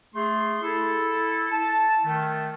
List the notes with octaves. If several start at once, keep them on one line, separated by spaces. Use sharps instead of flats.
A3 G#4 C6
E4 A4
A5
D#3 A3